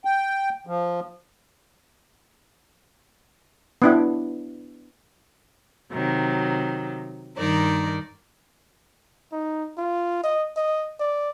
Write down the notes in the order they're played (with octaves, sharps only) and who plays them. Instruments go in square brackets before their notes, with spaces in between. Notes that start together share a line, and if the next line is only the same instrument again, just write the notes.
[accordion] G5
F3
[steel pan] B3 D4 E4
[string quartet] C3 D#3 F#3
G2 D#3 D#4 A#4 D5
[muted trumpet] D#4
F4
D#5
D#5
D5